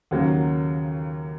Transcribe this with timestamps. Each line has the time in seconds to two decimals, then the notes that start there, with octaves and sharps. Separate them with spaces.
0.11 D#2 C#3 F#3 A#3